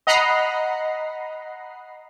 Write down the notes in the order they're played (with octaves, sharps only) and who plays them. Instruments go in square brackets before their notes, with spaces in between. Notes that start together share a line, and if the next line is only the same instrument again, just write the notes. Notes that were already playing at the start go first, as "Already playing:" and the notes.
[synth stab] D#5 F#5 A#5 B5 C7